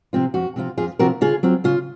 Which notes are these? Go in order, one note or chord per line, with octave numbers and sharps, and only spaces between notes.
C3 F3 C4 F4
F2 F#4
C3 F3 C4 F4
F2 F4 G#4
C3 F3 C4 F4 F#4 A#4
C#3 F4 G#4
F#3 C4 F4
C#3 F4